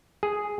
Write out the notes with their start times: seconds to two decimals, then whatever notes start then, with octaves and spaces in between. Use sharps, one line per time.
0.23 G#4